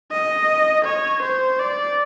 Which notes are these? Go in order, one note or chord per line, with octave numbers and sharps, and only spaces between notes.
D#5
C#5
C5
D5